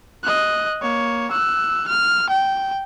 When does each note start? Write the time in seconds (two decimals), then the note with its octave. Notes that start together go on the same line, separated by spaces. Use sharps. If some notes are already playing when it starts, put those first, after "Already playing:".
0.24 D#5 F#6
0.82 A#3 C#5
1.32 E6 F#6
1.88 F6
2.30 G5